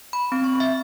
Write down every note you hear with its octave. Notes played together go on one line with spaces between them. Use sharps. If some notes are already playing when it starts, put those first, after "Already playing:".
B5
C4
C#6
E5